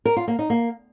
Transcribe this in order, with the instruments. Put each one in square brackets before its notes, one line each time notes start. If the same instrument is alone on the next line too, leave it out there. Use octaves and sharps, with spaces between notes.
[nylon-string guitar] A#4
F4
A#3
D#4
A#3